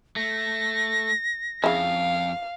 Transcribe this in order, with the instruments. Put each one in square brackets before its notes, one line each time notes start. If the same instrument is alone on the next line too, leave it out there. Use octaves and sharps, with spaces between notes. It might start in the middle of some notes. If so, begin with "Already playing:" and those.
[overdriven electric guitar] A3 [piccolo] A#6
[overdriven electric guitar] F2 [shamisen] C#3 E4 [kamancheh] F5